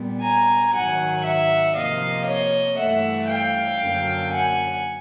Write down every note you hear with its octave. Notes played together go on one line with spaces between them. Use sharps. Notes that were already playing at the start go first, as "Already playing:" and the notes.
Already playing: A#2 G3 B3
G#5 A#5
G#2 D#3 F#3 F#5 G#5
E5 F#5
C3 F3 A#3 D#5 F5
C#5 D#5
G2 E3 A3 E5 F#5
F5 G5
F#2 D3 F#3 A#3
F#5 G#5